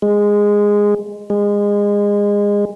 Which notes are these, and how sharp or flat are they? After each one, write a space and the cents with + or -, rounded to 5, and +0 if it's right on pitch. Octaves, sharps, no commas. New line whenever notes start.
G#3 -10
G#3 -25